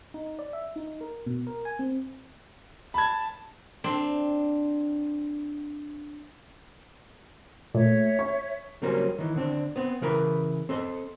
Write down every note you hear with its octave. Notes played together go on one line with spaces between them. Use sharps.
D#4
D5
E5
D#4
A#4
B2
A#4
G#5
C4
A5 B5 G#6
C4 D4
A#2 A3 C#5 E5
C#6
C#3 F#3 G3 A#3 C4 C#4
D#3 E3
D3 C4 D4
B3 C4
C#3 E3 A#4 B4
C4 A4 D#5